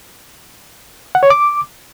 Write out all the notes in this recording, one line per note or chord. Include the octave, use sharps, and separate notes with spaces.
F#5
C#5
D6